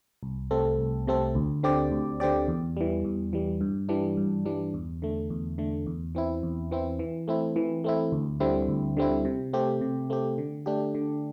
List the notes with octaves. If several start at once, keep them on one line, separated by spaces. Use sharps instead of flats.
C2
C3 A3 C4 A4
C2
C3 A3 C4 A4
D2
D3 C4 G4 D5
D2
D3 C4 G4 D5
E2
E3 G3
E2
E3 G3
G2
E3 G3 D4
G2
E3 G3 D4
E2
D3 A3
E2
D3 A3
E2
E3 C4 E4
E2
E3 C4 E4
E3
A3 C4 E4
E3
A3 C4 E4
D2
D3 G3 C4 E4
D2
D3 G3 C4 E4
C3
A3 C4 G4
C3
A3 C4 G4
D3
A3 D4 G4
D3